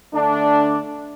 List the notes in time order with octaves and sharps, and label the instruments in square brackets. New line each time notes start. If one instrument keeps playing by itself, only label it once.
[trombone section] D3 A3 D4